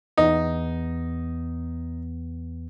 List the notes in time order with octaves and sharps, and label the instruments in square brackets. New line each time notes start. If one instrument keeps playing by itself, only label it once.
[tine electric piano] E2 B3 [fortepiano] D#4